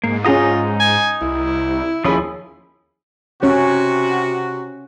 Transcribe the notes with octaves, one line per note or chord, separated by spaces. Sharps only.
G#2 A#3
C#4 D#4 F4 G#4 F#5 A#5 D#6
G#5
C2 E4
D#2 F3 C#4 E4 G#4 B5 D#6
C3 C#4 F#4 C#5